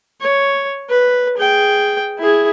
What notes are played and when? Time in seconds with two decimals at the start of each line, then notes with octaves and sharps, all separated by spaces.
0.21 C#5
0.90 B4
1.37 G#4 G5
2.19 E4 G#4